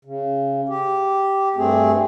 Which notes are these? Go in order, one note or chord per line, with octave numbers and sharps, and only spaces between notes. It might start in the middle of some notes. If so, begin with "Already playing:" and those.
C#3
G4
G2 A3 C4 G#4